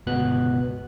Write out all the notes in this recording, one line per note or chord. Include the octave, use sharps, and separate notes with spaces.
G1 C#2 B2 B3 F#6